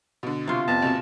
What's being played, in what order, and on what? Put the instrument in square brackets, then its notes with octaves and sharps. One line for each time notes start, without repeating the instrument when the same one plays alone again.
[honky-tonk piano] B2 D3
[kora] C3 F4 [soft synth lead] C#6
[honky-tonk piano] F2 [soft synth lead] B3 [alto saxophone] A5
[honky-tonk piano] F#1 B2 E7 [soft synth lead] C4